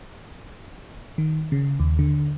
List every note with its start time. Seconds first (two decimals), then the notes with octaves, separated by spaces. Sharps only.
1.18 D#3
1.52 C#3
1.80 D#2
1.99 D3